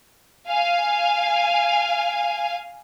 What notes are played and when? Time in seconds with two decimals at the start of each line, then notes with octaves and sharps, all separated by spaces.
0.48 F5 G#5